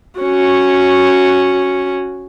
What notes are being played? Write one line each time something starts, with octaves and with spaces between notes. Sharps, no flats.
C#4 F#4